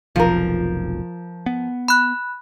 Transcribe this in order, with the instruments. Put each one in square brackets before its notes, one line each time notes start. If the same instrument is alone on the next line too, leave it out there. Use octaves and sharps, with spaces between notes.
[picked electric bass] F1 B1 [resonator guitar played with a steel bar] F3 A#4
[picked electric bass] B3
[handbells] B5 F#6